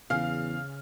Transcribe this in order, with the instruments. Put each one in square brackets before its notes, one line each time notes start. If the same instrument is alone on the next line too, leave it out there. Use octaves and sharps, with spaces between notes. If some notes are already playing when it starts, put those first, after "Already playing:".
[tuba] E2 [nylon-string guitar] C#3 [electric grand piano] F5 F6